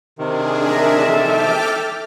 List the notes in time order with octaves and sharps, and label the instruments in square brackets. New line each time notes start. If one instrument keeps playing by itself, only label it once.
[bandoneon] C3 D#3 [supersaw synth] D4 G#4
[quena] A#4 [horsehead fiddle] E5
[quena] A4 [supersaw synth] G5 D6 F6